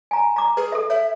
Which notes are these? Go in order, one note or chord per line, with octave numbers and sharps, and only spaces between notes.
G#5 A#5
A#5 D6
G#4 B4
A4 E5
C#5 E5